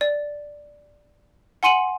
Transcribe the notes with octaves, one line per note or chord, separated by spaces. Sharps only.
D5
F#5 G#5 C6 C#7 D#7 F#7